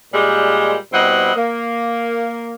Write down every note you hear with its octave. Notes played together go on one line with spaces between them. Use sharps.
A#2 G3 G#3
B2 G3 C4 E4 D#5 F#5
A#3